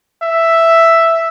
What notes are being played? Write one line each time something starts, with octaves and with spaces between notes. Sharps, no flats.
E5